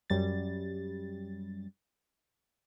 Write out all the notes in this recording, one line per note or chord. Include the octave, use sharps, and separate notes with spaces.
F#2 G3 A6